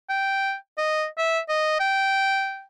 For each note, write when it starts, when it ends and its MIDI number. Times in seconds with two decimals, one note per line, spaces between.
0.09 0.55 79
0.78 1.06 75
1.18 1.40 76
1.49 1.77 75
1.80 2.63 79